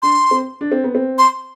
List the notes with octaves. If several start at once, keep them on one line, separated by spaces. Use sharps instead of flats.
D4 C6
C4
D4
C4
B3
C4
C6